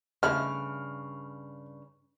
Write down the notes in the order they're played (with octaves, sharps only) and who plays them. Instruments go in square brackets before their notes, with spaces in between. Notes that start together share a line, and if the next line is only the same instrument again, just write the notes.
[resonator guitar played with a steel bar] G2 C#3 [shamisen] A3 E4 [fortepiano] F6